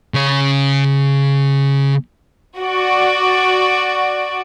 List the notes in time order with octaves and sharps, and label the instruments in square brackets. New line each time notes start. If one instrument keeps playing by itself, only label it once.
[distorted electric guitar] C#3 C#5
[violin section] F#4 D5